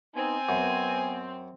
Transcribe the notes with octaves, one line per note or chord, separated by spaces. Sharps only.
B3 C4 D#4 G#5
F#2 B3